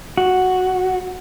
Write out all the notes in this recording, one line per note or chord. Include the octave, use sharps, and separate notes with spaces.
F#4